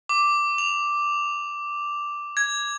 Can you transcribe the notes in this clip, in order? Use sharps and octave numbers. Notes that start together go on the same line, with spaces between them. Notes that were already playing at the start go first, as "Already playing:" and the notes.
D6
F7
G#6